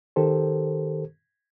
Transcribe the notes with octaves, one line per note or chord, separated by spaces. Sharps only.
D#3 G4 A4 A#4 C5